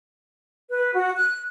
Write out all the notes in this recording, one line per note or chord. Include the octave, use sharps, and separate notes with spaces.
B4
F#4
F#6